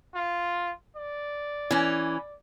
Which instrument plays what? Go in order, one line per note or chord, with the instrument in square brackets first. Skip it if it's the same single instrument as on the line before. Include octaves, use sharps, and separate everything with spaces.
[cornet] F4
D5
[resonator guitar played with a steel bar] E3 C#4